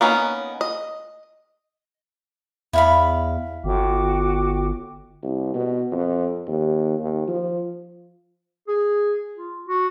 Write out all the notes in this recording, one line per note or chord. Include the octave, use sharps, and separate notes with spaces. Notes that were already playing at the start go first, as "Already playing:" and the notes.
A#3 B3 C#4 D#4
D#5
E2 E4 F5 B5
G1 F#4 G5 D6
C2
B2
F2
D#2
D#2
F3
G#4
F4
F#4